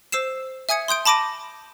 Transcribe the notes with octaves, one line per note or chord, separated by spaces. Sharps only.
C5 E6 C7 E7
E5 G#5 D#6 G#6 C#7
C6 D#6 G6 D7
A5 B5 D6 A#6 D7 D#7